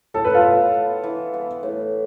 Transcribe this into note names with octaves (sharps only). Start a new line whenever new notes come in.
A2 A4
B4
F4 A4
B3
B3
E3
B3
A2